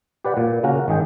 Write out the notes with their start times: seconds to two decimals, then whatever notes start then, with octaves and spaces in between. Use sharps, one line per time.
0.24 G4 B4 D5 F#5
0.37 A#2
0.63 C#3 A#3 C#4 F#4 A#4
0.88 G#1 D#3 G#4 G5